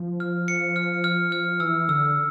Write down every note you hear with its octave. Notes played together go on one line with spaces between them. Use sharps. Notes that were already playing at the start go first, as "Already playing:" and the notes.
Already playing: F3
F6
C#7
F6
F6
F6
E3 E6
D3 E6